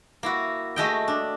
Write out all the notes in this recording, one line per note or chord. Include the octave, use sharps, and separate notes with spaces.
A#3 E4 F#4
G#3 A3 F#4 D#5 E5 G5
D4